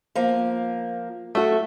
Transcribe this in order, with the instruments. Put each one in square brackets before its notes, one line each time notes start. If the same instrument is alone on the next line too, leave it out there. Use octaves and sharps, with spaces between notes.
[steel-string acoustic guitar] F3 A#3
[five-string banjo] A3 F#4 [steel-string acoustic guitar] E5